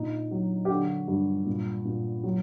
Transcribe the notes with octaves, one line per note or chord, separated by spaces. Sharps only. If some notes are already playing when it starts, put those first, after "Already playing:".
Already playing: A#2 D#4
F#3
G4
D3 F#4
G2
A#2
A#2
F#3